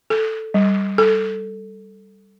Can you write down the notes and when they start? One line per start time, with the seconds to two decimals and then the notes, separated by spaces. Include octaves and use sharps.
0.10 A4
0.54 G3
0.98 A4